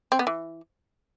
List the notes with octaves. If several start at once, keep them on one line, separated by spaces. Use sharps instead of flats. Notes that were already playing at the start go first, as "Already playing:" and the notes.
C4
B3
E3